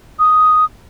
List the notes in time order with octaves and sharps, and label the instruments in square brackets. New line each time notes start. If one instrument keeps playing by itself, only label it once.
[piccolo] D#6